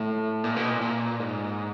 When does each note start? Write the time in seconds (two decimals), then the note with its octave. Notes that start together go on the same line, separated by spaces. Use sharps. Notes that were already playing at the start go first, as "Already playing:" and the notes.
Already playing: A2
0.44 A#2
0.56 B2
0.69 A#2
0.81 A#2
1.20 G#2